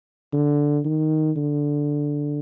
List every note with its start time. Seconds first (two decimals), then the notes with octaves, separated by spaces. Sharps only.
0.33 D3
0.85 D#3
1.36 D3